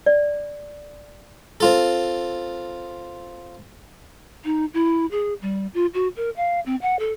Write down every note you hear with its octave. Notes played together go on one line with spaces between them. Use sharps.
D5
C4 F4 A4
D#4
E4
G#4
G3
F4
F#4
A#4
F5
C4
F#5
A4